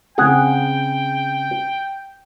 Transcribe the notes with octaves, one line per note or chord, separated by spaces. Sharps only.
C#3 C4 G#4 F#5 G5